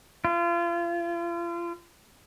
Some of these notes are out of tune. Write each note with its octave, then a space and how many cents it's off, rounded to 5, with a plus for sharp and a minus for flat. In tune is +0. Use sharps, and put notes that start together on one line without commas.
F4 -35